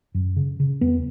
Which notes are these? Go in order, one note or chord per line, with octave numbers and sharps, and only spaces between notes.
F#2
C#3
C#3
E2 B3